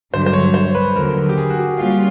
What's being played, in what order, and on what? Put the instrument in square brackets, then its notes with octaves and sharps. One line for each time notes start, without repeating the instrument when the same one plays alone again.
[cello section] G2 D3 F#3 [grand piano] C5
[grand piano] C5
C#5
C5
B4
[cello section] D#2 D3 F#3 [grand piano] A#4
[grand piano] G4
G#4
F#4
G4
[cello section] G3 A#3 C#4 F4